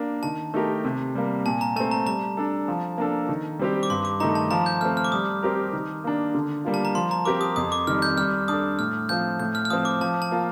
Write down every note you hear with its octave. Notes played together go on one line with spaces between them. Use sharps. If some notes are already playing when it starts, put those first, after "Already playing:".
Already playing: A#3 D4
D#3 A5
A3 D#4 G4 A#4
C3
G3 A#3
A#2 A5
A#5
A3 C4 A5
A#5
G3 A#5
D4 A4
F3
A#3 D4 A4
D#3
G3 C4 G4
D6
G2 C6
D6
D#3 A3 D#4 A#5
A5
F3 A#5
G6
A3 C4 F6
F6
D6
G3 D#6
C4 G4 A#4
D#3
A#3 D4
D3
G3 A#3 F4
A5
A#5
F3 C6
A#5
C4 G4 A#4 D6
D#6
F2 D#6
D6
D#3 G3 F6
G6
G3 F6
D4 A4 D#6
A2 F6
F3 C4 F4 G6
A2 G6
F6
F6
F3 C4 D#6
D6
F3 A5
A5
A#3 F4